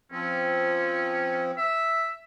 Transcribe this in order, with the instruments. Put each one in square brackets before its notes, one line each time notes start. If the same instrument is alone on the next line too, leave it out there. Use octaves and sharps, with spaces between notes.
[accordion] F3 C4 [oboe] C#4
[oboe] E5